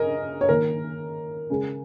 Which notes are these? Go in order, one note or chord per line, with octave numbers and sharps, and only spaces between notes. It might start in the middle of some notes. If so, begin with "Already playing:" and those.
Already playing: C#3 A#4 C#5 D#5
C#5
D#3 A#3 A#4
C#3 G#3